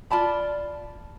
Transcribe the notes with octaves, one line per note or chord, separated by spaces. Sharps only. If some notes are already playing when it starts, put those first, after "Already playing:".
F4 D5 A5 B5